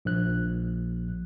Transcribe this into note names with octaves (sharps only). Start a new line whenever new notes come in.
A#1 F#6